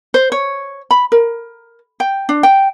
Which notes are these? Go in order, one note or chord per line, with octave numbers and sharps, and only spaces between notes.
C5
C#5
B5
A#4
G5
D4
G5